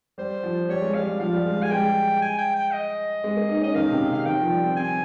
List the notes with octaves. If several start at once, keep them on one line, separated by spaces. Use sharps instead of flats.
G3 C5
F3
G3 C#5
G#3
G3 F5
G3
F3 F5
G3
G#3
G#3
G#5
G#3 G5
G#5
G5
G5
D#5
G#3
A#3
D#4
C#4 D#5
D#3 F5
C3
C#3
F5
D#3 G5
F3
G3
C4
C4 G#5